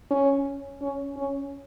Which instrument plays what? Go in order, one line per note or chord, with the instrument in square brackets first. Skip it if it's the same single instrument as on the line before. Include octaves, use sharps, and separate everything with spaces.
[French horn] C#4
C#4
C#4